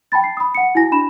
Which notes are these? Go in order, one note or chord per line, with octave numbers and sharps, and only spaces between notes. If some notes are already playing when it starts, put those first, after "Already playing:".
G5 A5 B5 A6
C7
B5 D#6
F#5 C#7
E4 F#4 G#5 A#6
D4 B5 E7